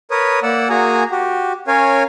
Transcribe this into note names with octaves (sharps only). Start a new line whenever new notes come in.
A#4 B4 C#5 D#6
A#3 D5 F#5 E6
A#3 F#4 G#4 G#5 A#5
F#4 G4
C#4 A#4 C#5 F5 G#5